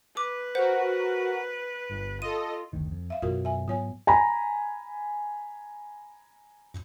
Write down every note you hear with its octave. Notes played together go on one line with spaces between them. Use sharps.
B4 D6
F#4 A#4 C5 F#5
G1
F4 A4 D#5 D#7
F#1 D2 D#3
F2
E5 F5
F#2 B2 F#3 F4 F#4 A#4
E5 G#5
G#2 F#3 B3 F4 C#5 G#5
G#5 A#5 B5